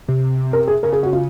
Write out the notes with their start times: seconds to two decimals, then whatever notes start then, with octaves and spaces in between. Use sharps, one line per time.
0.08 C3
0.53 A#4
0.68 G#4
0.83 C#3 A#4
0.93 G#4
1.03 F#4
1.13 F4